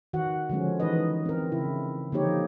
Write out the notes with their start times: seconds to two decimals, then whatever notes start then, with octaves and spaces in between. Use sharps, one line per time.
0.13 D#3 F#4 F#5
0.49 D3 F3 G#3 C#4
0.80 D#3 E3 G#3 D#4 B4 D#5
1.26 C4 A#4
1.52 C#3 E4
2.12 D3 F3 A#3 D#4 G4 C#5